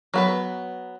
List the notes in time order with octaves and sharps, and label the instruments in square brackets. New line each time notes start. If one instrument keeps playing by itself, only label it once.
[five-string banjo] F#3 B3 B4